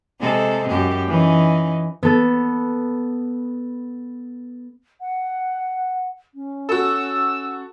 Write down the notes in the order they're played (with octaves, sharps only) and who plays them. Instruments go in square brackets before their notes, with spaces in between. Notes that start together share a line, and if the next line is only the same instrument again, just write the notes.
[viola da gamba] C3 G#3 A4
F#2 G4
E3 C#4 D#4
[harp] B3 A4
[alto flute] F#5
C#4
[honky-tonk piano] F#4 A4 [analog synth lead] E6